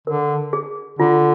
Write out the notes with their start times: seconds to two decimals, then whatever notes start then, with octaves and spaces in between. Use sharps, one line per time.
0.07 D3 A#4
0.53 G#4
0.99 D3 F4